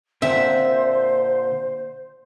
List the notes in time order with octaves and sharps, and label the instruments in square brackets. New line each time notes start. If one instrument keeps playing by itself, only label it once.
[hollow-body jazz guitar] A#2 D3 C4 [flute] C5 [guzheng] E5